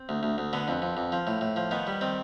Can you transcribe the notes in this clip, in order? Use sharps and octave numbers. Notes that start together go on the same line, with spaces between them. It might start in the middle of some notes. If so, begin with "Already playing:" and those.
Already playing: C4
D2
D2
D2
D3 B3
F2
F2
F2
F3
A2
A2
F3
D#3 B3
G3
D#3 C4